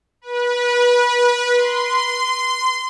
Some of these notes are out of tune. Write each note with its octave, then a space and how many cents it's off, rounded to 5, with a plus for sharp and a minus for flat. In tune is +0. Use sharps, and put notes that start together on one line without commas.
B4 -25
C6 -20